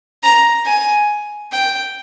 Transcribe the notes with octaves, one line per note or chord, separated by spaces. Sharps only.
A#5
G#5
G5